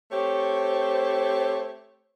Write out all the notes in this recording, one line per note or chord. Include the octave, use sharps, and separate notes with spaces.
A3 C4 G4 C#5